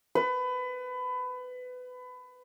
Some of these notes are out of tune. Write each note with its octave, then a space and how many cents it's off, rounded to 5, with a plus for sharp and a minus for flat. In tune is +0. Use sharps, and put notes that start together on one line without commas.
B4 +25